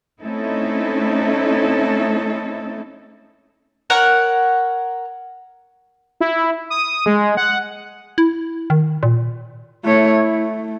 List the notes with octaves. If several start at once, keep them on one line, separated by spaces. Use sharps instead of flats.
A3 C4 C#4 D#4 E4 A4
A#4 C#5 F#5
E4
D#6
G#3
F#5
E4
D#3
A#2
A3 E4 C#5
A3